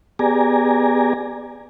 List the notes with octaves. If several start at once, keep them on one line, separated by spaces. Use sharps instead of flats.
B3 G4 G#4 D5 G#5 A#5